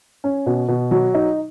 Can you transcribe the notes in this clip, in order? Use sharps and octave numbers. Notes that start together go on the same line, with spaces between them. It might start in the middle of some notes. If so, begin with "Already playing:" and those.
C#4
B2
B2
F#3
D#4